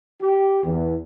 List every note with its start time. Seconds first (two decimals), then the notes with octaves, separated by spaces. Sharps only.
0.22 G4
0.64 E2